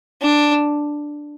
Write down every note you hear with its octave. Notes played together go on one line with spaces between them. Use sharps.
D4